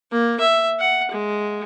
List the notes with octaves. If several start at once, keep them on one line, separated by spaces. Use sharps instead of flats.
A#3
E5
F#5
G#3